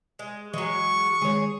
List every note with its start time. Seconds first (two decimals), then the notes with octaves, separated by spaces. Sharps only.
0.19 G#3
0.54 E3 F#3 G#3 C#6
1.22 D#3 G#3 G#4 C#5